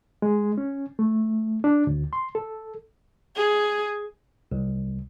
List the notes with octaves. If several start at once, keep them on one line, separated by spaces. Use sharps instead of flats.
G#3
C#4
A3
D4
D2
C6
A4
G#4
C2